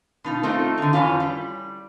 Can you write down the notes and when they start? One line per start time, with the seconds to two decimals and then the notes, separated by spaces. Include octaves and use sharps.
0.24 B2 D#4 F4
0.43 A3 C4 D#4 F4
0.78 D3 D#4
0.93 F2 E3 C#4 F4
1.20 G3